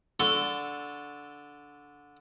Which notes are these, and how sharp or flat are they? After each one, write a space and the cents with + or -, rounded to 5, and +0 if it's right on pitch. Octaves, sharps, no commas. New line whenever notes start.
D3 -10 A4 +5 C#6 -10